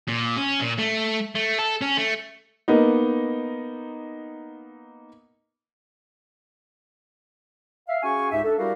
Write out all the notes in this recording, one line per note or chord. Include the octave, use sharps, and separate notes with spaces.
A#2
C#4
A#2
A3
A3
A4
C#4
A3
A#3 B3 D#4
E5 F5
C#4 F#4 G#4 F5 G#5 C#6
C#2 G#2 D#4 G4 E5
D4 A4
G3 E4 F#4 G4 A#4 F5